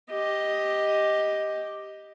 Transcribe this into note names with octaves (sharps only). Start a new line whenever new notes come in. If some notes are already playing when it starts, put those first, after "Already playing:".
G4 D#5